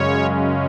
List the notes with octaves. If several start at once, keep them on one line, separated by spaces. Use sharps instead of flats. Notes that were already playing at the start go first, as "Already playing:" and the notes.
Already playing: F#2 C#3 G#3 C#4 C#5